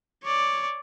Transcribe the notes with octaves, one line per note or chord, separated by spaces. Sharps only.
C#5 D5